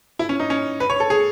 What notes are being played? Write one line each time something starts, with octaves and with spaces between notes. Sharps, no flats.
E4
C#4
D#4
C#4
B4
C#5
A4
G#4